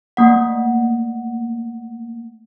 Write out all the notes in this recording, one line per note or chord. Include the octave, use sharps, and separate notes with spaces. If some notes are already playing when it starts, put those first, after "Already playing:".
A3 A#3 F#5